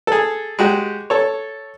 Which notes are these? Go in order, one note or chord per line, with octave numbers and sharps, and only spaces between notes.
G#4 A4
G#3 F#4 G4
A4 C#5